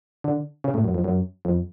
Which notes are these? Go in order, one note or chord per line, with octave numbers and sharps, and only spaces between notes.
D3
C#3
A2
F#2
F2
F#2
F2